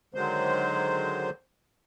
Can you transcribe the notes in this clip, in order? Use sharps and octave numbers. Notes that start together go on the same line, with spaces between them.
D3 D#3 F#3 G#3 C5